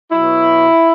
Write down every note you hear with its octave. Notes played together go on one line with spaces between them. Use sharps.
B2 F#3 E4